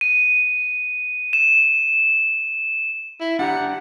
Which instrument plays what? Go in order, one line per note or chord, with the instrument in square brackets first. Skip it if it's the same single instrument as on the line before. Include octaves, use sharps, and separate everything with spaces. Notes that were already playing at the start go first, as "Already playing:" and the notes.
[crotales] D#7
E7
[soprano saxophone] E4
[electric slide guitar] D4 G4 A#5 [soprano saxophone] F#5